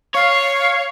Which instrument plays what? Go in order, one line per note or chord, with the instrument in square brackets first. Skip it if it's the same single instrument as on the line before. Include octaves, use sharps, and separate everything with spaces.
[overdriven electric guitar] C#5 [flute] F5